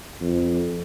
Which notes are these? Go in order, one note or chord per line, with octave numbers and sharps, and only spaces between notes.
F2